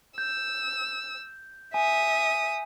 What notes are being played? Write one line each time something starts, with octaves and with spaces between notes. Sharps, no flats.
E6 G6
E5 G#5 D#6